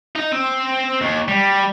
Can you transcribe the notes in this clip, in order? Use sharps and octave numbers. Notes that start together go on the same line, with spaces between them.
D#4
C4
D#2
G3